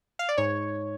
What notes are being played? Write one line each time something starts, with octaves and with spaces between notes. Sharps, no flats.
F5
D5
G#2 C#5